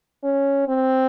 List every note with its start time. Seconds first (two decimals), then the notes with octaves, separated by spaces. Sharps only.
0.24 C#4
0.68 C4